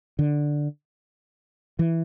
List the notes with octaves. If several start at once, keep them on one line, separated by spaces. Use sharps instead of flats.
D3
E3